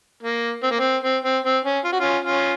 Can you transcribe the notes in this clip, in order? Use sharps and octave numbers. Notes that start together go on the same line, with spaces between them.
A#3
C4
A#3
C4
C4
C4
C4
C#4
F4
F#4
C#4 F4
C#4 F4